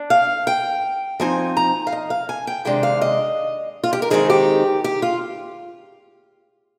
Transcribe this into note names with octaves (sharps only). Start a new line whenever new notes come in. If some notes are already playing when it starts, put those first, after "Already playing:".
Already playing: D4
F5
G5
F3 C4 D#4 G#5
A#5
F5
D#5
F5
G#5
G5
C3 D#3 G#3 D4 G5
F5
D#5
F4
G4
A#4
D#3 G#3 C4 D#4 G#4
G4
G4
F4